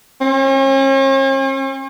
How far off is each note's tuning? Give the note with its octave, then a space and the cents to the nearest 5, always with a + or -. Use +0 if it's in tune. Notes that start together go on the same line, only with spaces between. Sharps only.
C#4 -45